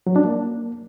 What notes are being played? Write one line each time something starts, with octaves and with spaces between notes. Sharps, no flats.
F#3
D4
A#3